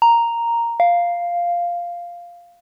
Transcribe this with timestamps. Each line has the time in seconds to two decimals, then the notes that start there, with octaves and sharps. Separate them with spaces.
0.02 A#5
0.80 F5